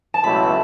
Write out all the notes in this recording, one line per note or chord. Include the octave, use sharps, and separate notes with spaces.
A5
C#2 B2 F#3 A3 E4 B5